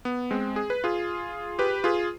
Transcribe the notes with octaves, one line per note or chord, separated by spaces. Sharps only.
B3
G#3 C4
G#4
B4
F4 G#4
G4 B4
F4 G#4